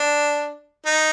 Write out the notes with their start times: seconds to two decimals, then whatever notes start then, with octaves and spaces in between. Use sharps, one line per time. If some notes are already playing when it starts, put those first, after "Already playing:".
Already playing: D4
0.86 D#4